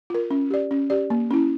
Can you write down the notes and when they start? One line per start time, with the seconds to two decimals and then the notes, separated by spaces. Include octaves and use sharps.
0.10 F4 A#4
0.31 C#4
0.50 G4 D5
0.71 C#4
0.90 G4 D5
1.10 A#3
1.31 C#4 E4